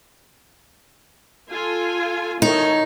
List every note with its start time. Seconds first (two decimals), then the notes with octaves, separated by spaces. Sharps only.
1.50 F4 A4 G#5
2.42 D#3 D#4 A4 C#5